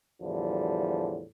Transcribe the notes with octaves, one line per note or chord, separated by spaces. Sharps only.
E2 A2 D3 F3 G3